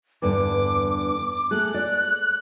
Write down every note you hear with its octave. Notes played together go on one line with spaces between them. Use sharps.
E2 G2 D3 D6
A3 G#4 F#6
D5